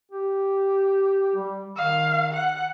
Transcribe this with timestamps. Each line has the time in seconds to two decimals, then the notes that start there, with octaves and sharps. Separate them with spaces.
0.11 G4
1.36 G3
1.76 D#3 F5
2.33 F#5